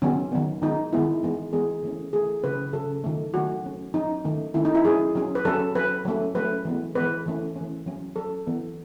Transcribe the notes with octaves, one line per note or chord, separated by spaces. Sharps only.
D#3 F#3 B3 C#4
D#3 F#3 B3
D#3 G#3 B3 D#4
D#3 G#3 B3 E4
E3 G#3 B3
E3 G#3 B3 G#4
E3 A3 C#4
E3 A3 C#4 G#4
C#3 F#3 C#4 B4
C#3 F#3 C#4 A4
D#3 F#3 A3
D#3 F#3 A3 F#4
F#3 C#4
F#3 C#4 D#4
D#3 A3 C#4
D#3 A3 C#4 E4
D#4
E4
F#3 C#4 G#4
F#3 C#4
B4
F#3 C#4 A4
F#3 C#4 B4
F#3 A3 C#4
F#3 A3 C#4 B4
E3 G#3 B3
E3 G#3 B3 B4
E3 A3 C#4
E3 A3 C#4
F#3 C#4
F#3 C#4 A4
E3 B3